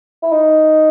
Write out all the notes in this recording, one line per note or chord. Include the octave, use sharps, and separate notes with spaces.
E4
D#4